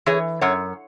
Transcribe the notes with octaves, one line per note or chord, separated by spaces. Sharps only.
E3 G#4 C#5
F#2 C#5 F#5